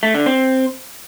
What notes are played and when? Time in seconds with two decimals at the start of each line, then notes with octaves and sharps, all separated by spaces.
0.03 A3
0.14 D3
0.26 C4